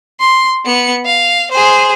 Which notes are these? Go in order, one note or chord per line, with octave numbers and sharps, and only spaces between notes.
C6
B3 C#7
F5
G#4 C5